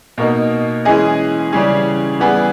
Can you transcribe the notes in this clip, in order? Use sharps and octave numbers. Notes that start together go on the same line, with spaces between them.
B2 A#3 D#4
E3 G#3 C#4 G#4 D#5
C#3 E3 G3 C#4 G#4
E3 G3 B3 E4 G#4